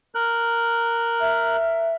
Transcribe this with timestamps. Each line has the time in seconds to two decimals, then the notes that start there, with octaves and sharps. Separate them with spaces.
0.15 A#4 F#6
1.20 E5